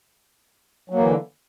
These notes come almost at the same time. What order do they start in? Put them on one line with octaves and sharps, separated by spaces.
F#3 A#3 E3 D3